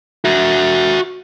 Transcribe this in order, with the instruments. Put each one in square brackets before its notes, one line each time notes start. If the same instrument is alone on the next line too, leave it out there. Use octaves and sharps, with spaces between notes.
[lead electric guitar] F#4 E5